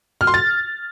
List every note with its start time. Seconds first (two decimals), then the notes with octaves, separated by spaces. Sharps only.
0.21 F6
0.27 C6
0.34 A6